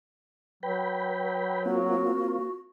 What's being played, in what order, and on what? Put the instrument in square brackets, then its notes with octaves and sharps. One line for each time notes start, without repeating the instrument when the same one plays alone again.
[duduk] F#3 [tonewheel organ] B4 G5 B5
[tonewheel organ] A#3 C4 F4 [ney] F#4